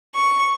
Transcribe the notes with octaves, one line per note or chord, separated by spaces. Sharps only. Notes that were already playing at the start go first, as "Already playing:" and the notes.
C#6